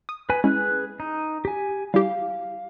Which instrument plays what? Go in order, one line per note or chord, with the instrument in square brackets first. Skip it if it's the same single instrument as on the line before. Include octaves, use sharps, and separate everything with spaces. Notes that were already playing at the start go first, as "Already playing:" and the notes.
[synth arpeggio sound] D#6
[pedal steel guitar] B4 G#5
[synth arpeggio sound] G#3 C#4 E4 [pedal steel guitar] G#4 B4 F#6
[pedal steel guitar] D#4
G4 G#5
[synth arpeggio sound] G3 E4 G4 [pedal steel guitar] F5